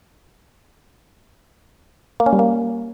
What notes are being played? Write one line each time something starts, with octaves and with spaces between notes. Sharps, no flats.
A#3
C#4
G3
A#3